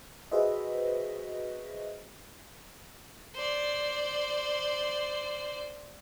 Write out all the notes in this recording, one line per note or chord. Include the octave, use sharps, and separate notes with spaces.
F#4 G#4 B4 C5 D#5 E5
C5 D5